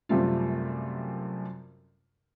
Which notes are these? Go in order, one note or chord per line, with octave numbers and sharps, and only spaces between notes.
F#2 C3 G3 A3 F4